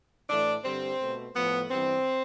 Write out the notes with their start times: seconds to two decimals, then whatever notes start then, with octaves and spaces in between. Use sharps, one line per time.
0.28 A2 E3 A3 D4
0.64 G2 D3 G3 C4
0.98 B2 A3
1.35 A2 F3 A3 B3
1.69 G2 E3 G3 C4